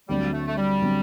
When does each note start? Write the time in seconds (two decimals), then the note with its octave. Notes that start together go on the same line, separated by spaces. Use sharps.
0.09 D2 D3 F#3 G3 C4
0.33 A3
0.47 A3
0.57 G3
0.82 D3 F#3 C4